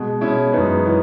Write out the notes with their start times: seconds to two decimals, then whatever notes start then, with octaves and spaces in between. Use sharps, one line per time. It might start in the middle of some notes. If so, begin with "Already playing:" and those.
Already playing: B2 G#3
0.21 B2 G#3 C#4 E4
0.53 F#2 E3 G#3 B3 D#4
0.85 E3 G#3 B3